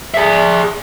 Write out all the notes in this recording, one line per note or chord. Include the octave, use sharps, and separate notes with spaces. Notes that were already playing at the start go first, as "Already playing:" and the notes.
G#4 E5